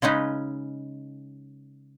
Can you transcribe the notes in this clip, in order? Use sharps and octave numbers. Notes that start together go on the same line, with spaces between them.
C#3 G#3 C#4 D#4 B4